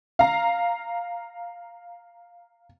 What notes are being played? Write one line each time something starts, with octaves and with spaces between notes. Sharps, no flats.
F5 A#5